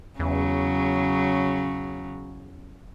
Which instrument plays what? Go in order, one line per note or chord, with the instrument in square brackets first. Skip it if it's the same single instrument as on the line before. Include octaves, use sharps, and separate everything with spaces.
[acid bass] E2 [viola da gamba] C#3 F#3